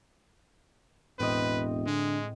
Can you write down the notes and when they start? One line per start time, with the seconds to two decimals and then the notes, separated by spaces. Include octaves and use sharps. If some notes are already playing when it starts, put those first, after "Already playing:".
1.19 E1 A2 C4 B4 D#5
1.87 D3 G#3